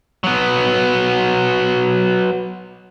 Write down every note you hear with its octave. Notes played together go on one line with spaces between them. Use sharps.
F#3 B3